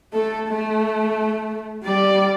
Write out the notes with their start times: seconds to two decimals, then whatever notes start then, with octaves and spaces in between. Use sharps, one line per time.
0.13 A3 A4
0.48 A3
1.84 G3 D5